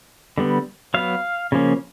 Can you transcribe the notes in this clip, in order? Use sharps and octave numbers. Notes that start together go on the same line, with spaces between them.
D3 G3 B3
F#3 B3 F5
C#3 F3 A#3 C#4